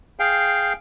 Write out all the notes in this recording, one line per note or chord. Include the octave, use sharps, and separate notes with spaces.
G#4 F5 G5